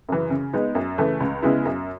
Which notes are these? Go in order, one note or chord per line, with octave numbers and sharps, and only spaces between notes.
F#2 C#3 E3
C#3
G#3 B3 D#4
F#2
C#3 E3 A3
C#2
C#3 G#3 B3 E4
F#2